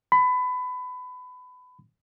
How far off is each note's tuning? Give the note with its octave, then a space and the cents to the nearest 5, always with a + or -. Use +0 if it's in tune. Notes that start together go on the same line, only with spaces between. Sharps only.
B5 +25